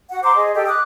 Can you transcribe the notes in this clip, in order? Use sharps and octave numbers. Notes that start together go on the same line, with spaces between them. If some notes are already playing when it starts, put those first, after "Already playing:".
F#4 F#5
C5 A#5 C6 D6
G#4 D#5
G4 A4 D#5 G5
D6 D#6 F#6